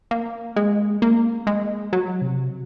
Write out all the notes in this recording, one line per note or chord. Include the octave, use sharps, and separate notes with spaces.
A#3
G#3
A#3
G#3
F#3
C3